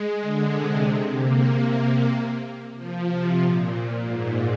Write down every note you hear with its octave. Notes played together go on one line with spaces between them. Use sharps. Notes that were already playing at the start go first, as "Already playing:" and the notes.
Already playing: G#3
D3
C3
C3
A#3
A#3
F3
C3
A#2
G#2